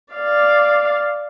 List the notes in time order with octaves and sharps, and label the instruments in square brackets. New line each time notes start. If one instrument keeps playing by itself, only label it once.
[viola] D5 F5